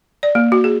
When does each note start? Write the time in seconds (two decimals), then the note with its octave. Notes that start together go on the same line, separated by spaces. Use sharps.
0.23 D5
0.35 A#3
0.52 F#4
0.64 G#4